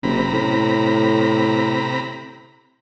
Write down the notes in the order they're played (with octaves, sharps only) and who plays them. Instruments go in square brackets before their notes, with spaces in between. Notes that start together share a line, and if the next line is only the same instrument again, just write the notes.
[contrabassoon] F#1 [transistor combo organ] C3 A#5 B5
[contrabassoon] A2